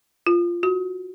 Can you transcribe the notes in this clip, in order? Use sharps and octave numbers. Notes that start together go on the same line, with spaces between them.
F4
F#4